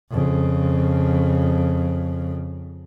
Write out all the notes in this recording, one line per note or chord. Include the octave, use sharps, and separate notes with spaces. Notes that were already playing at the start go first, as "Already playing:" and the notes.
F2 C#3